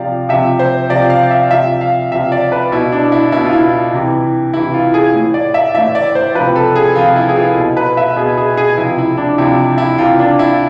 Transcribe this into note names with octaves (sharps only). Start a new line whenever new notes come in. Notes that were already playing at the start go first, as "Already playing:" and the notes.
Already playing: C3 F3 D5 F5
C3 F3 E5
C5
C3 F3 D5
F5
E5
C3 F3 E5
F5
C3 F3 E5
D5
B4
B2 E4
D4
E4
B2 E4
F4
E4
C3 E3
C3 E3 E4
F4
G#4
A2 E3
D5
E5
A2 E3 E5
D5
C5
C3 F3 B4
A4
G#4
C3 F3 F4
E4
G#4
F4
B2
B4
E5
B2 G#4
G#4
G#4
C3 F3 E4
E4
D4
C3 F3 E4
E4
C3 E3 F4
D4
E4